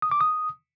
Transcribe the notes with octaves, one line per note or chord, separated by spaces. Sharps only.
D#6
D6
D#6